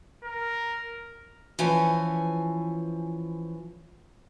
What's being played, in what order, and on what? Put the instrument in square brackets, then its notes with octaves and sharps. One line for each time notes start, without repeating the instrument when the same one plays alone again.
[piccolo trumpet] A#4
[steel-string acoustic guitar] E3 F3 C#4 G#5